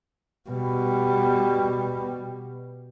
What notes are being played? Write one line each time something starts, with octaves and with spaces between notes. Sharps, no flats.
B2 G3